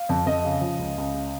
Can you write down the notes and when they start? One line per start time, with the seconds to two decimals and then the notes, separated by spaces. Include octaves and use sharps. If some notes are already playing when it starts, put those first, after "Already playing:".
Already playing: F5
0.09 F2
0.26 F2 D#5
0.45 C#3
0.61 F3
0.79 C#2
0.98 C#2
1.14 C#3